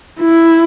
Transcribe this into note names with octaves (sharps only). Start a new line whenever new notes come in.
E4